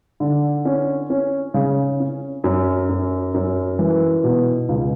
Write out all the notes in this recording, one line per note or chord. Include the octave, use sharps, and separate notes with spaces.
D3
C#4
C#4
C#3
C#4
F#2
F#2
F#2
E3
B2
C#2